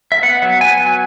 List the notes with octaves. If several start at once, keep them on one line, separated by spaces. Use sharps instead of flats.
E5
B3 F#5
F#3
B3 G#5
F#3